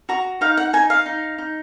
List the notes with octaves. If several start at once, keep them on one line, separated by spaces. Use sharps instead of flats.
F#4 A#5
D#4 F5
F#5
D#4 G#5
F5
D#4
D#4